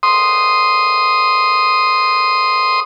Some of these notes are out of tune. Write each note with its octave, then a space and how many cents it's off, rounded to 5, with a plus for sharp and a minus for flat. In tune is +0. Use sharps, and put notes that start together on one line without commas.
C6 +0 D#6 +0